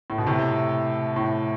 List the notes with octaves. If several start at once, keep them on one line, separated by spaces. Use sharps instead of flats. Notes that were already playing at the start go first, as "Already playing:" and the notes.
A2
B2
A2 C3
A2